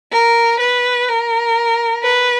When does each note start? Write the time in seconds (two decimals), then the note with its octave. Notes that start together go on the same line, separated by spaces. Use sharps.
0.12 A#4
0.60 B4
1.08 A#4
2.03 B4